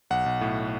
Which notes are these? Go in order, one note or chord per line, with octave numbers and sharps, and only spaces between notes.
B1 F#5
B1
A2